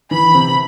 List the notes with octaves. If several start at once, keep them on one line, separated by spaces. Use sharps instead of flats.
E3 B5
C3